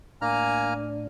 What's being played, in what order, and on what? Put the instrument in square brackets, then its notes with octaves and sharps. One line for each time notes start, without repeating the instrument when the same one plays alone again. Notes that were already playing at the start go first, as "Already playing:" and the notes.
[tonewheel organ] A2 D4 [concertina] A#3 A#5 F6 [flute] G#5